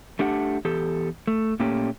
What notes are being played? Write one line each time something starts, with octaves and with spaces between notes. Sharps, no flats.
A3 D4 G4 F#5
E2 G4 A4
A3
A#2 A3 A#3 C#4 G4